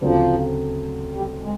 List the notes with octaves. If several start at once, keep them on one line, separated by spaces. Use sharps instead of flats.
D2 C#3 F3 F#3 A3 C4
G3
G#3